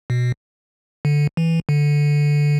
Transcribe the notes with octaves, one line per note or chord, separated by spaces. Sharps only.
B2
D3
E3
D3